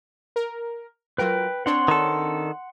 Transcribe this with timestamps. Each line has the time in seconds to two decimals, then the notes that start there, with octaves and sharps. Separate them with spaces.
0.36 A#4
1.18 F#3 F4 A#4 B4 G5
1.66 C4 D4 C#5 F#5 C6
1.88 D#3 A4